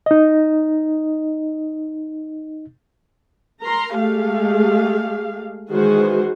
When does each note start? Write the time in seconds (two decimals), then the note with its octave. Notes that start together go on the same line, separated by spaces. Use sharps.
0.06 D#4 D#5
3.62 A#4 A#5 C6
3.98 G#3 A3 G4 F5
5.71 D#3 E3 G#3 F#4 G#4 C5